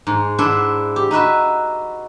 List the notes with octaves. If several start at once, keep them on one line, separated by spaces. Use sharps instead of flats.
G#2
D4 E4 B4 E5 F#5 C6
G4
D#4 F#4 B4 E5